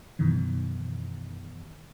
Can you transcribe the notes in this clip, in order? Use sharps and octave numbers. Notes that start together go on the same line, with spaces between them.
F#2 B2 D#3 E3